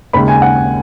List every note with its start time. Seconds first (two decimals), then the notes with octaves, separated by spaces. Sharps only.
0.13 D#2 C#3 G#3 B5
0.28 G#5
0.42 F#5